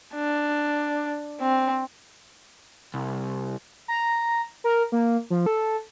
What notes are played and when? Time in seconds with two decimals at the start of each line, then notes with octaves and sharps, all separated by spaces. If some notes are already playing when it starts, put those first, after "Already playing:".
0.14 D4
1.41 C4
2.94 C2
3.88 A#5
4.64 A#4
4.92 A#3
5.30 F3
5.46 A4